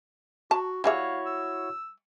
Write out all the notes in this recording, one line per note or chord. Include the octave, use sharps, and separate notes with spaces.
F#4 A5
G3 E4 F#4 G#4 C#5 E5 F5
E6